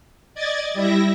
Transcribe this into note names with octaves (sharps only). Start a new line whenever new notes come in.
D5 D#5 G#6 A6
G3 E4 E5 A#6